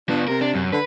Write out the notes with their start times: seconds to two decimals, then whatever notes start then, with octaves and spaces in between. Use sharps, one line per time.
0.09 B3 D4 F4
0.28 C3 A#4
0.41 D4
0.55 F#2
0.72 D3 B4